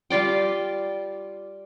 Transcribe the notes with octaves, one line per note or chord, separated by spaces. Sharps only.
G3 F4 D5 G5